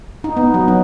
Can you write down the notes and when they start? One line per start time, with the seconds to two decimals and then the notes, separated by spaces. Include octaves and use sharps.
0.24 D#4
0.37 B3
0.54 F#3
0.68 D#4